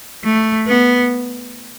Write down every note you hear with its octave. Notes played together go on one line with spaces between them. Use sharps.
A3
B3